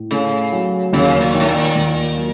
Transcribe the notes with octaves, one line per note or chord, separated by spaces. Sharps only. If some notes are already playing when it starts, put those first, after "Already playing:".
Already playing: A2
C#3 A3
F#3
D#2 C#3
A#2
D#3
A2
A#2
D#2
F#3